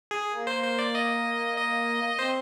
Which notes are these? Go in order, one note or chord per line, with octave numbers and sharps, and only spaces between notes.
G#4
A#3
C5
C5
D5
D#5
D#5
C4 C5